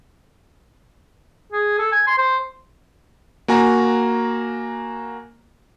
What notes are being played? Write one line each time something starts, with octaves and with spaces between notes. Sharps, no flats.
G#4
A4
G#5
C6
C5
A#3 F#4 G#5 A#5